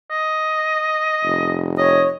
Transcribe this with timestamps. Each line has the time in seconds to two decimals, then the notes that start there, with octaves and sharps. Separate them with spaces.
0.11 D#5
1.25 F1
1.78 C#5 D#5